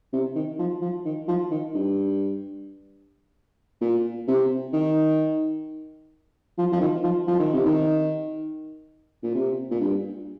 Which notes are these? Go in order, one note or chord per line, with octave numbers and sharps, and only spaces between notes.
C3
D#3
F3
F3
D#3
F3
D#3
G2
A#2
C3
D#3
F3
F3
D#3
F3
F3
D#3
C3
D#3
A#2
C3
A#2
G2